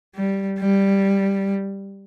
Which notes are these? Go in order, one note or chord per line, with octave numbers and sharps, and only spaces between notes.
G3
G3